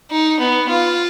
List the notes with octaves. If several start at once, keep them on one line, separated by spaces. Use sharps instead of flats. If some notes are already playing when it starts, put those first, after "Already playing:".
D#4
B3
F4